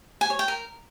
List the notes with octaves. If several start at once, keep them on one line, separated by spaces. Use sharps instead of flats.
G#5
C#5
G5
A#4